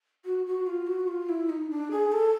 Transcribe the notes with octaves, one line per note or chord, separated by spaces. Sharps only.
F#4
F#4
F4
F#4
F4
E4
D#4
D4
G#4
A4